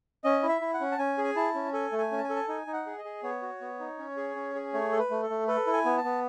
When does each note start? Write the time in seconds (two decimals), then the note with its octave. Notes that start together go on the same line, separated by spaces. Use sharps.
0.24 C#4 D#5
0.43 E4
0.49 E5
0.61 E4
0.74 F#5
0.80 C#4
0.92 A5
0.99 C#4 G#5
1.18 G#4
1.24 G#5
1.36 E4 A5
1.55 C#4
1.73 A4 G#5
1.92 A3
1.98 G#5
2.11 C#4
2.18 A5
2.24 G#5
2.29 A4
2.36 A5
2.48 D#4 G#5
2.67 D#4
2.73 F#5
2.86 G#4
2.98 D#5
3.05 G#4
3.23 B3 C#5
3.42 F#4
3.61 B3
3.80 D#4
3.98 C#4
4.17 G#4
4.35 C#4
4.55 G#4
4.74 A3 C#5
4.92 A4
4.99 B4
5.11 A3
5.23 A4
5.30 A3
5.48 A4 B4
5.67 E4
5.73 G#5
5.85 B3
5.97 A5
6.04 B3